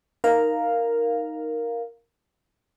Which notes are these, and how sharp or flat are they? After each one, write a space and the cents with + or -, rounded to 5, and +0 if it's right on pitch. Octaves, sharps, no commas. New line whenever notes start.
D#4 +0 A#4 +0 F5 +0